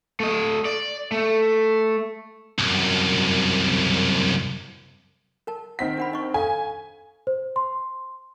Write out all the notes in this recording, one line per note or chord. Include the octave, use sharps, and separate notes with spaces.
A3 D#5
D5
A3
C2 F#2
A#4 A5
D#3 C4 F#5 B6
D4 F#5 B5
D#4 D#5 C#6
A4 F5 G#5
C5
C6